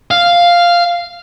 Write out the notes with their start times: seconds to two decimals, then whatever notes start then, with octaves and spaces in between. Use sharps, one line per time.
0.11 F5